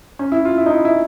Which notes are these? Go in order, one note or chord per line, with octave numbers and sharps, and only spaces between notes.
C#4
E4
F4
E4
D#4
E4
E4